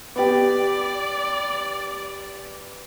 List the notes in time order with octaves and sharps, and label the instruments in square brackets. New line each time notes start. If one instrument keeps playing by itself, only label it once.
[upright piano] B3 G4 [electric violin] D5